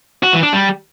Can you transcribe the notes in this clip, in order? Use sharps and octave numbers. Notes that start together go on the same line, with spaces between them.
F#4
E3
D4
G3